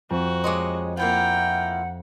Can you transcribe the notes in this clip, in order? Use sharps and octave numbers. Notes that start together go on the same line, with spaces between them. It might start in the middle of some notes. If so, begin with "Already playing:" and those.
F2 F#4
G#3 C#5 D#5 C6 D6
A#3 E4 F4 F#5 G5 A#5